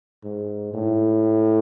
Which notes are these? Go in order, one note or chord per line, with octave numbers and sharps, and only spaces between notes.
G#2
A2